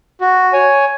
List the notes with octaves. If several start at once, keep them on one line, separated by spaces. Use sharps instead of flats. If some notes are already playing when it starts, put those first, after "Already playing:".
F#4
C#5 G#5